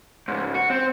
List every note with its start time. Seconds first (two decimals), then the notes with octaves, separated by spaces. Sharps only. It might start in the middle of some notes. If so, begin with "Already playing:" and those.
0.28 C#2 G#2
0.54 F#4
0.70 C4